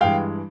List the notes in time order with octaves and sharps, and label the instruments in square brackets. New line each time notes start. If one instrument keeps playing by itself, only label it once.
[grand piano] G2 E3 G#3 F5 G5